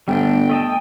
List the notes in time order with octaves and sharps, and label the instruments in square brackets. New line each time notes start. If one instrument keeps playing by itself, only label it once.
[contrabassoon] G1 [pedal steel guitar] G3 A3 D4 [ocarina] G5
[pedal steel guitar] A3 D#5 A5